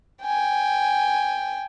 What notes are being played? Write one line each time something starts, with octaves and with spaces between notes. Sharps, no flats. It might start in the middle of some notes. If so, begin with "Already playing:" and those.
G5 G#5